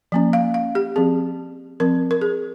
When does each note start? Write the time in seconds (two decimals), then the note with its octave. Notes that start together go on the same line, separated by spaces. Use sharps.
0.12 F3 A#3 C#4
0.33 F5
0.54 F5
0.75 G4
0.96 F3 C4 G#4
1.80 F3 C4 A#4
2.11 A#4
2.21 G#4